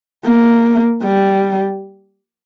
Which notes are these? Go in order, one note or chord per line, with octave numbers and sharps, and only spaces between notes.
A#3
G3